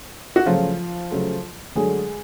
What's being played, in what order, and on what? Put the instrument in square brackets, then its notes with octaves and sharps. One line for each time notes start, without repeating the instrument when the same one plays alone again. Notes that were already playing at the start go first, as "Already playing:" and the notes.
[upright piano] F#4
C#3 F3 F#3 A3 F4
C#3 F#3 A3
D3 F#3 G#3 A3 G#4